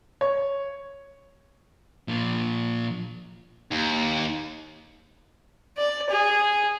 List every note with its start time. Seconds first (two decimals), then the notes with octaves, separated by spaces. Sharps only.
0.21 C#5
2.08 A#2 F3
3.71 D#2
5.77 D5
6.10 G#4